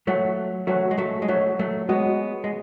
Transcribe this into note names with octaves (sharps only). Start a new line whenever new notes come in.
F#3 A3 F#4 C#5 F#5
F#3 A3 F#4 C#5 F#5
G#3
F#3 A3
G#3
F#3 A3 F#4 C#5 F#5
F#3 A3
G#3 B3 F#4 C#5 F#5
G#3